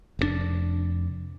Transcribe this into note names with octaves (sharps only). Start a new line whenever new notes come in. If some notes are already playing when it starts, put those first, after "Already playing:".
F1 C3 D4